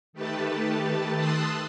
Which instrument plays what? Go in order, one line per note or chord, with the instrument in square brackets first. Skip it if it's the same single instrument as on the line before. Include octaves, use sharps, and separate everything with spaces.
[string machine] D#3 A3 G4 B4 A5
A5 C6 D#6 E6 F#6